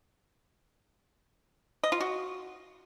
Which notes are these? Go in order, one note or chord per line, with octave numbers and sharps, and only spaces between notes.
D#5
F4
F#4